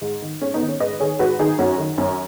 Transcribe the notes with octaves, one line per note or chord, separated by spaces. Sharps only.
G#2
D#3
G#2 C#4
B3 D#4
D#3
C#4
G#2 B4 D#5
D#3 G#4 C#5
G#2 F#4 B4
D#3 D#4 G#4
F#2 C#4 F#4
D#3
F#2 C#4